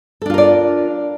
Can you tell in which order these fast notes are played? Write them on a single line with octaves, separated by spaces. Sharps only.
A4 D4 F4 A#4 D5